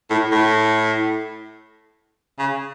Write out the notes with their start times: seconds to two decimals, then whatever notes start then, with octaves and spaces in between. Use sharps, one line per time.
0.10 A2
0.32 A2
2.39 C#3